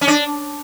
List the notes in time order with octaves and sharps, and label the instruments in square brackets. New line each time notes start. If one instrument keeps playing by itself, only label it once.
[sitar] C#4
D4